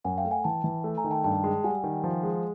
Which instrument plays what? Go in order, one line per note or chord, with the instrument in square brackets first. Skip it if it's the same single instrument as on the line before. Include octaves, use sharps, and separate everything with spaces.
[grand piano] F#2 [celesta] F#5 G#5
[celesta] F5 G5
[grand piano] A3
[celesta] F#5 G#5
[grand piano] E3 [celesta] G5 A5
[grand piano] E3
A3
[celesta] G#5 A#5
[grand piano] D#3
[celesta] G5 A5
[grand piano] G2 [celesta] G5 A5
[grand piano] G#3
[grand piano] G3 [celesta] F#5 G#5
[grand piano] D#3
F3
G#3